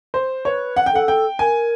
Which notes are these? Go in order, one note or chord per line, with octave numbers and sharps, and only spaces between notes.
C5
B4 C#5
F#5
G5
A4 F#5
G5
A#4 G#5